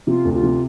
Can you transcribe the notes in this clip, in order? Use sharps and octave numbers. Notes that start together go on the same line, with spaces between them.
C3 F4
D2
F4
C3